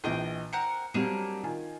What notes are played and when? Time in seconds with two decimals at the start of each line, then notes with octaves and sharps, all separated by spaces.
0.04 A#1 E3 G#4 D#5 G5
0.53 C4 A#4 F#5 C#7
0.94 F#3 G3 A#3 C4 D4 G#4
1.43 D#3 F4 G#5